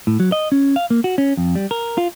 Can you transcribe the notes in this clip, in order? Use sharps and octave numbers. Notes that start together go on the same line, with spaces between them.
A2
F#3
D#5
C#4
F5
A#3
F#4
C#4
F2
G3
A#4
F4